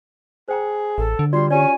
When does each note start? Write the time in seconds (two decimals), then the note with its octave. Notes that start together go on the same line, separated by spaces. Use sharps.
0.48 G#4 C5 G5 A#5
0.98 A1 A4
1.19 D3
1.33 G3 F4 F#4 D5 C6
1.50 C#4 G4 D5 G#5